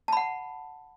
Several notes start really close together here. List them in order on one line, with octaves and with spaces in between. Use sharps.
A5 B5 F#5